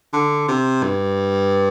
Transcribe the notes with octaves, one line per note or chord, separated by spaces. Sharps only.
D3
C3
G2